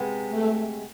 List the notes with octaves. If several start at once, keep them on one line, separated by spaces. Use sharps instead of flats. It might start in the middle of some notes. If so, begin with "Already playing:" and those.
Already playing: C3 G#3 B3
A3